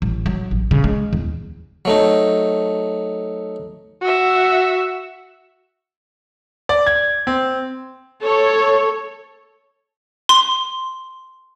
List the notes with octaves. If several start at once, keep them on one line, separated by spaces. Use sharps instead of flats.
A1
F#3
A1
C#3
G#3
E2
F#3 A3 D#4
F#4 E5
D5
G#6
C4
A4 C#5
C6